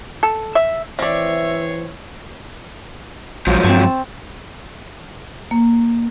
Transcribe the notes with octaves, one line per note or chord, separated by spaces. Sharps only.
A4
E5
E3 C4 C#5 D5 E5 C7
A#1 G#2 F3 F#3
G2 C4 A5 C#6
A#3